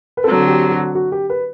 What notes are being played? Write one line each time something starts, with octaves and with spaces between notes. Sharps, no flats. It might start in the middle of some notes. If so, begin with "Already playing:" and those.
B4
D3 F#3 C4 A4
G4
F#4
F#4
G4
B4